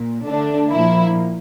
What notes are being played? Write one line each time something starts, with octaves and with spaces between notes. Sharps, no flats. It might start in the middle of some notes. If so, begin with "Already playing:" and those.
Already playing: A#2
D3 A3 D4
A#2 F3 A#3 E4